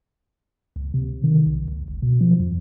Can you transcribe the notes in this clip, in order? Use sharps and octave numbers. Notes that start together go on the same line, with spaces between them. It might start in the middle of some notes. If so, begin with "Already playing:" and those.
C#2
C3
D#3
B1
C#2
F#1
B2
F3
F2